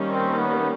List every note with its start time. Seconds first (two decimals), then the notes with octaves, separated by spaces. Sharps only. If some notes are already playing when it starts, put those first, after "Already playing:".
Already playing: D#3 G3 A#3 C#4
0.09 C4
0.39 B3